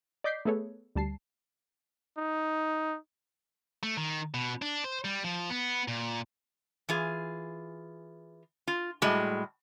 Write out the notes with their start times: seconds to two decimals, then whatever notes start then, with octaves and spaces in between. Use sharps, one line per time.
0.24 D5 D#5 D6 G6 B6 C7
0.45 A3 B3 G#4 A4 B4 C#5
0.95 D2 G3 A5 C7
2.17 D#4
3.83 A3
3.97 D#3
4.34 B2
4.62 D4
4.84 C5
5.05 G3
5.24 F3
5.50 B3
5.88 A#2
6.89 E3 F4 G#4
8.67 F4
9.02 A2 G3 G#3 F#4